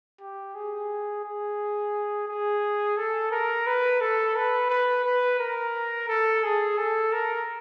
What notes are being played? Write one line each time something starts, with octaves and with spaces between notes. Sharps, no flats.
G4
G#4
G#4
G#4
A4
A#4
B4
A4
B4
B4
B4
A#4
A4
G#4
A4
A#4